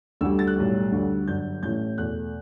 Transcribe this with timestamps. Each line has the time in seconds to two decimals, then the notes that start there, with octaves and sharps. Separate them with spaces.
0.21 D2 D3 G3 E6
0.39 A6
0.47 F#6
0.56 B1 A2 G3
0.92 D2 D3 G3
1.27 G1 G2 F#3 G6
1.63 A1 A2 E3 G6
1.98 E2 B2 A3 F#6